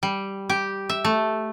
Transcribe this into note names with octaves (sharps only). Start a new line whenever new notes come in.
G3
G4
E5
A3